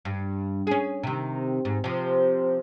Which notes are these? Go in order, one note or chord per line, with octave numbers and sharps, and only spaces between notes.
G2
C#4 G#4
C3 D#3
G#2
C3 F3